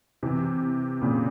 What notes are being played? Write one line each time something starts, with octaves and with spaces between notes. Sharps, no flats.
C3 E3
A#2 C#3